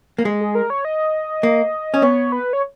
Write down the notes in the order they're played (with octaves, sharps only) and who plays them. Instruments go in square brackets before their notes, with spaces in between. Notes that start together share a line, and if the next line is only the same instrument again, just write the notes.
[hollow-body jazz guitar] A#3
G#3
[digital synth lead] G#4
A#4
C#5
D#5
[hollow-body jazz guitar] A#3
C#4
[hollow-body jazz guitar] B3 [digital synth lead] C#5
[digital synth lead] B4
C#5